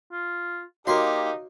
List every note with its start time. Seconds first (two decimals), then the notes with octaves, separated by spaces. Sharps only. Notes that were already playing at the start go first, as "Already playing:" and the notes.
0.12 F4
0.87 A#3 D#4 F#4 G4 C#5 F5 C6